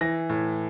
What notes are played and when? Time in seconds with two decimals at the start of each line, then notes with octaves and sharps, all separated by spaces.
0.01 E3 A#6
0.30 A2